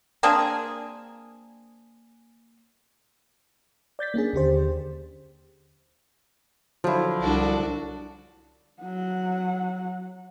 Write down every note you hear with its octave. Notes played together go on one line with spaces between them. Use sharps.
A#3 C4 D4 G#4
D5 G6 A6 B6
A#3 C#4 D4 G#4
D#2 D3 G4 C5
D3 F3 F#3 E4
C2 D4 F#4
F#3 F#5